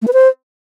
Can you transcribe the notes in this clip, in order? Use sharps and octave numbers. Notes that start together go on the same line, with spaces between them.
A3
B4
C5